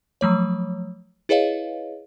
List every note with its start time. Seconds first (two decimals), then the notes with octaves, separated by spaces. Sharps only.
0.21 F3 F#3 A3 C#5
1.29 E4 G#4 B4 C#5 D#5 F5